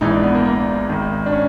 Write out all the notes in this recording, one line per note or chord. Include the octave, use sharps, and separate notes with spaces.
A#1 G#2 E3 D#4
D4
B3
A#3
A#3
G#1 G#2 D#3
D4
C#4